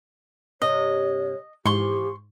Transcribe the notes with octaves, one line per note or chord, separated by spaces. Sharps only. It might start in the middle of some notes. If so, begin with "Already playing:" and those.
G2 C3 C#5 D#5
G#2 E3 F3 G4 C6 C#6